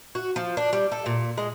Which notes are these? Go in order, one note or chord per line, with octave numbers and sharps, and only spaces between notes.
F#4
F3
D4
G3
A4
A#2
G#3